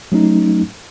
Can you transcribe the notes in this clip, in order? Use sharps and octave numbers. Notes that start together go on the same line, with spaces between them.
F#3 A3 C#4 D#4